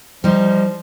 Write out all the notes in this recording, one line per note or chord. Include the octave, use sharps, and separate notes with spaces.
F3 G3 D#4